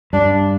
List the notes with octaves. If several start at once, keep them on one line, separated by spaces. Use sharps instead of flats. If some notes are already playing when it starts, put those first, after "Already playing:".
G2 D4